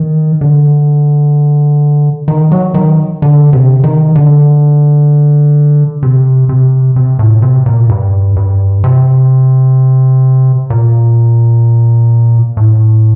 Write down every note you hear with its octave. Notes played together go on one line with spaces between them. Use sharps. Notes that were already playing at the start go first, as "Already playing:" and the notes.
Already playing: D#3
D3
D#3
F#3
D#3
D3
C3
D#3
D3
C3
C3
C3
A2
C3
A#2
G2
G2
C3
A#2
A2